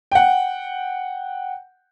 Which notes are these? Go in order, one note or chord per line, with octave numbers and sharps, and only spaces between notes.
F#5 G5